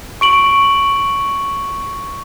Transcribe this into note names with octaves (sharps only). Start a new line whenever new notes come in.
C#6 D7 F#7